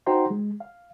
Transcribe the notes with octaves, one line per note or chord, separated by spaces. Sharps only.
D#4 F#4 C5 G5 A#5 C6
G#3
F5